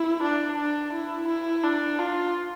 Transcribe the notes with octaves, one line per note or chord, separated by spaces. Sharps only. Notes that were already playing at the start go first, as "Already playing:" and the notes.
Already playing: E4
D4
D4
E4
E4
D4
F4